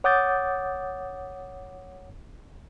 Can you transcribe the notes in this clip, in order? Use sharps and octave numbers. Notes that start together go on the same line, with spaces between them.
C#5 F#5 D6 D#6 G6 A6